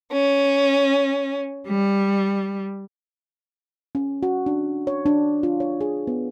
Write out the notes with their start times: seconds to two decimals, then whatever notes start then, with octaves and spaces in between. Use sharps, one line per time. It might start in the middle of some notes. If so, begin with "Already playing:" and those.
0.13 C#4
1.68 G3
3.95 C#4
4.23 F#4
4.46 D4
4.87 C#5
5.06 D4
5.43 F4
5.60 C#5
5.81 G#4
6.07 B3